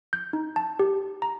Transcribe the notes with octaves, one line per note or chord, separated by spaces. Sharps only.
G6
D#4
A5
G4
A#5